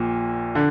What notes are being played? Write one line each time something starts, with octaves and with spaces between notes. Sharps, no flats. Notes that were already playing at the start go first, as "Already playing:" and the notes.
Already playing: A#1 A#2
D3